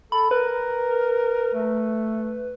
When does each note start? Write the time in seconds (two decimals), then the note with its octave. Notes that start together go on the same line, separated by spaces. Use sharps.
0.12 A4 B5
0.31 A#4 B4
1.54 A3